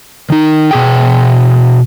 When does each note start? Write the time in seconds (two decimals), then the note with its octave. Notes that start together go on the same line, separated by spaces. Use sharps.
0.30 D#3 D#4
0.71 B2 G#4 G5